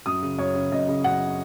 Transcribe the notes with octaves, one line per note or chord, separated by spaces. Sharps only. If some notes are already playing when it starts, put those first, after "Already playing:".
F#2 D#6
C#3
F#2 C#5
C#3
F#2 D#5
C#3
F#2 F#5